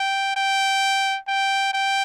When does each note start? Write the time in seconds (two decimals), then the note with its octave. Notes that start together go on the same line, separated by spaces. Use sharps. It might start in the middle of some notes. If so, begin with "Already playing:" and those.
Already playing: G5
0.36 G5
1.28 G5
1.74 G5